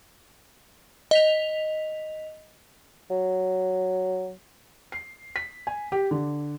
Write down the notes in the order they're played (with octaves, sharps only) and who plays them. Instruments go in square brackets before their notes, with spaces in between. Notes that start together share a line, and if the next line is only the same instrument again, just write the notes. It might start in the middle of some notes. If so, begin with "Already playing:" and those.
[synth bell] D#5 B6 F7
[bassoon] F#3
[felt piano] C7
B6
G#5
G4
D3